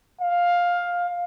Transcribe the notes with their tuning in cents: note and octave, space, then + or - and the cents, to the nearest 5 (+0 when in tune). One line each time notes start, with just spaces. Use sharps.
F5 +10